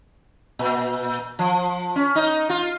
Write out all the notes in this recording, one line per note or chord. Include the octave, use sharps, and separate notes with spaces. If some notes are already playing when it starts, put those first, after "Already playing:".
A#2
F3
C#4
D#4
F4